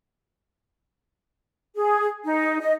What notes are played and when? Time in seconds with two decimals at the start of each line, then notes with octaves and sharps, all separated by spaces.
1.76 G#4
2.24 D#4
2.60 D#5